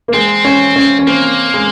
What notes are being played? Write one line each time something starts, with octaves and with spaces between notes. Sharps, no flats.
A#3
G#3 C4
C#4
C#4
C#4
A#3 C4
G#3